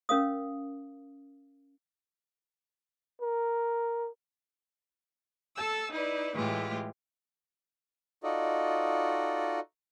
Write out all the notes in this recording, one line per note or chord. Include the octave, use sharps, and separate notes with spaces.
C#4 A#4 F5 D#6
A#4
A4 A5 E6
D#4 E4 B4 D5
A2 E3 G#3 A3 F4 G4
D#4 F4 F#4 A4 D5 D#5